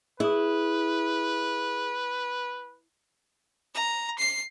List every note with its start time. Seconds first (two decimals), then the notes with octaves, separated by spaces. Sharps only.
0.20 E4 G#4 B4 D#6
3.75 A#5
4.19 C7